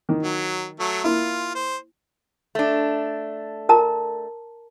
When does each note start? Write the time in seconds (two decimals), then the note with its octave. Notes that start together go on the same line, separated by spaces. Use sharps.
0.09 D#3
0.23 F#3
0.80 F#3 A3
1.04 A#3 E4 F4
1.55 C5
2.55 A3 D4
3.69 A#4 A5 A#5